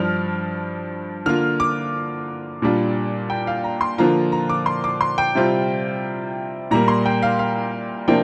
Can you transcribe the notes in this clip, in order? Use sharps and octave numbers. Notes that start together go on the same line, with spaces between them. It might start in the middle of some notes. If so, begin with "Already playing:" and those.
Already playing: G2 F3 D4 F6
D3 A#3 F4 F6
D6
A#2 G3 D4 F4
G5
F5
A#5
C6
D3 F3 A#3 F4 A#5
A#5
D6
C6
D6
C6
G5
C3 G3 C4 F4
A#2 G3 A#3 A#5
C6
G5
F5
F5
C3 F3 A#3 D4 F4 G5